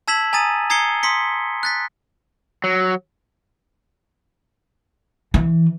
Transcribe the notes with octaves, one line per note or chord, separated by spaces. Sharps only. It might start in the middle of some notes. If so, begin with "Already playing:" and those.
A5 E6 G#6 B6 E7 F#7
G#5 A#5 D#6 A6 D#7
A#5 D#6 G#6 C7 C#7 G7
C6 D#6 B6 C#7 G7
F#6 A6 B6
F#3
E3